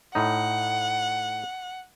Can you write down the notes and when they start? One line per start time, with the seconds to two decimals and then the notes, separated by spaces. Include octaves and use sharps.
0.15 A2 D#4 F#5